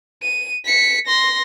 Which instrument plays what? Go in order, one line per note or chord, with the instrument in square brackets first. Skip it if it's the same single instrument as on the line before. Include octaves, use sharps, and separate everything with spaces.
[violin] D#7
B6 C#7
C6 A#6